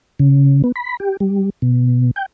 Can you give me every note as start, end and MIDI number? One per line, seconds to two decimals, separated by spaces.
0.19 0.62 49
0.64 0.72 59
0.76 0.97 83
1.00 1.17 67
1.20 1.50 55
1.62 2.11 47
2.16 2.26 79